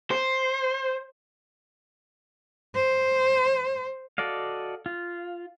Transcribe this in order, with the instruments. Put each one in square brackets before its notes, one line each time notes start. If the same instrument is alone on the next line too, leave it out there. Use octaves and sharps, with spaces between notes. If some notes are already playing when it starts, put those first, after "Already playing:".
[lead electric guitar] C5
[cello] C5
[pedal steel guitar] F#4 A4 D5 D#5 F5
F4